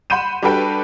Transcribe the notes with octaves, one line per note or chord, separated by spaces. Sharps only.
F#5 B5 C6 G6 D#7 E7
G3 D4 F#4 A4 B4 G5